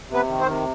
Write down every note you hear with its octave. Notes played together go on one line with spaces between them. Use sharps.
C3
B3 B4
D#3
C4 C5
C3